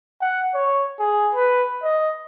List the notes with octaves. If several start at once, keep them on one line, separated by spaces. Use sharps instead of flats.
F#5
C#5
G#4
B4
D#5